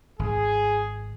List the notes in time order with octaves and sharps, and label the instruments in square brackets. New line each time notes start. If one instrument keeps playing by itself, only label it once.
[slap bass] G#1 [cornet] G#4